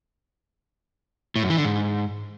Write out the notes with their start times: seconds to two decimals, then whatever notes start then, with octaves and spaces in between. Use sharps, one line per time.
1.36 A2
1.43 F#2
1.50 E3
1.57 D3
1.65 G#2